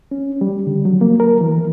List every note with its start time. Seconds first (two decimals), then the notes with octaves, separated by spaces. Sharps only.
0.11 C#4
0.41 G3
0.67 D3
0.85 F#3
1.01 A#3
1.20 A#4
1.41 E3